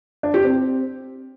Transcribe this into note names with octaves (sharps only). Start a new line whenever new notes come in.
D4
G4
C4